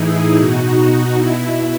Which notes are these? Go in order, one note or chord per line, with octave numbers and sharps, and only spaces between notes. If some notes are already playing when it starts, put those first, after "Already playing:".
Already playing: A2 E3 D#4 E4 G#4
B2 D#4 F#4
D#4
B2 E4